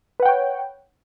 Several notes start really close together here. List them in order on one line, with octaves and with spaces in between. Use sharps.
B4 F#5 G5 C#5